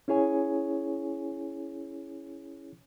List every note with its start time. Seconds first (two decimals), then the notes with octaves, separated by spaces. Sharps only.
0.08 C#4 E4 G#4 C#5 G#5